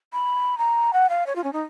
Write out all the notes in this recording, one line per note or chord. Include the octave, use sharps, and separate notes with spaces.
B5
A#5
F#5
F5
C#5
F4
C#4
D#4